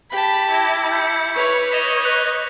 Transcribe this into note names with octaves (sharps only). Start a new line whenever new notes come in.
G4 A5 B5
E4 D6 G#6 A#6
G6 B6 C#7
B4 C#5 C#6 F7
D#5 B6 E7 F7
F#6 B6 F7